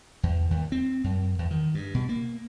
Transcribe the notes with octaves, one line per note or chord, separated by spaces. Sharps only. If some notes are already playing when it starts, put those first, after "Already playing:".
E2
D#2
C4
F#2
E2
D#3
G2
B2
A#3